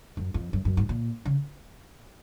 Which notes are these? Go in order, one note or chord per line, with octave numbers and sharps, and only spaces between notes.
F#2
F2
F#2
F#2
G#2
A#2
C#3